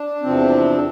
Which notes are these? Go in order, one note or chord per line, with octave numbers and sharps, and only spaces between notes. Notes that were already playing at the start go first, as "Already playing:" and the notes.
Already playing: D4
E2 C3 F3 C4